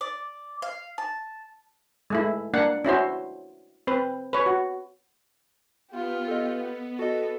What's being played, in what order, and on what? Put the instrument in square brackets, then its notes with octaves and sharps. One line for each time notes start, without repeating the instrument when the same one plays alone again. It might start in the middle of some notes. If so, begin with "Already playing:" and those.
[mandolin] D5
F5
A5
[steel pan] G#3 A3 E4
A#3 D4 F#5
C#4 E4 F#4 C5
C4 B4
B4 C#5
F#4
[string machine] B3 [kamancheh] F4 G4
[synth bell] A4 D#5
[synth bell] F#4 D#5 [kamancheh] A4